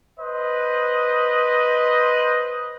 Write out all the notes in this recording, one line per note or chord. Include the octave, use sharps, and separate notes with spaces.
B4 C5 D#5